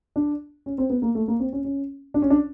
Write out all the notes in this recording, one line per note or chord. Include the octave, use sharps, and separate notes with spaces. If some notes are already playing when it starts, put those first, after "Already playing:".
D4
C#4
C4
B3
A#3
A3
A#3
C4
C#4
C#4
D4
C#4
D4